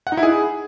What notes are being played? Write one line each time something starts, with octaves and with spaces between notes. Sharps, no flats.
F#5
D#4
E4
G#4